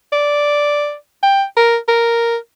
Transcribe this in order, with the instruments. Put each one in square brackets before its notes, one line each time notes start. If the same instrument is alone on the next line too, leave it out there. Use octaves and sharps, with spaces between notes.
[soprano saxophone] D5
G5
A#4
A#4